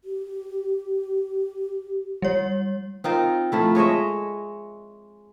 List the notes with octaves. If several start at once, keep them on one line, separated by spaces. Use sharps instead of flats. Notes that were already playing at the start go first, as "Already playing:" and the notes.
G4
G3 C#5
C4 D#4 F4 A#4
F3 A3 E4
G#3 C#5 D#5 E5